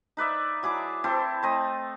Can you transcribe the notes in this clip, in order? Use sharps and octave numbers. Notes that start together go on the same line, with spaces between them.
D#4 B4 D5 E5
F#3 E4 G#4 D6
C4 E4 A4 C5
A3 C4 D#5